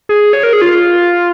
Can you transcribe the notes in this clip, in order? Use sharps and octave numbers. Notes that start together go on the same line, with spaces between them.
G#4
C#5
A#4
G#4
F4